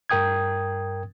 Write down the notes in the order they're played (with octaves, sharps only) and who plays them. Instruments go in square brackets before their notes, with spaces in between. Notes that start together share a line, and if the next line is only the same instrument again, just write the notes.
[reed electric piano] G2 A#4 G5 D#6 G#6